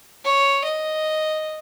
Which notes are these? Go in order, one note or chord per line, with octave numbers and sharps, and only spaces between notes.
C#5
D#5